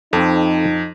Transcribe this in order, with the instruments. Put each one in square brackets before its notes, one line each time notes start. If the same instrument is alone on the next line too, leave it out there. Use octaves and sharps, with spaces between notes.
[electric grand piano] F2 [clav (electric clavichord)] C4 A4 [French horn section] D#4